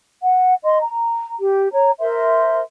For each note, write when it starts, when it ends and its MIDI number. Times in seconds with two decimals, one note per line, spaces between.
0.22 0.54 78
0.63 0.77 75
0.63 0.77 84
0.80 1.35 82
1.39 1.68 67
1.72 1.91 73
1.72 1.91 82
2.00 2.60 70
2.00 2.60 72
2.00 2.60 76
2.00 2.60 84